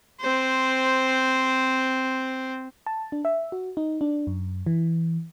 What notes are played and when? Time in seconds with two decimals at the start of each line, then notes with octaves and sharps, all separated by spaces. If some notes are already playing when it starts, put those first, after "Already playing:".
0.20 C4 C5
2.87 A5
3.12 D4
3.25 E5
3.52 F#4
3.77 D#4
4.01 D4
4.27 F#2
4.66 E3